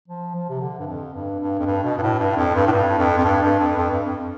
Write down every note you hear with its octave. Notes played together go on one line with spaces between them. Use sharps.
F3
F3
C3
D3
G2
F2
G2
G2
F2
G2
B2
G2
A2
G2
F2
G2
A2
G2
F2
F2
G2
G2
F2
F2
G2
F2